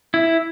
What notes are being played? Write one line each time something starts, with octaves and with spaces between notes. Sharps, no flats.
E4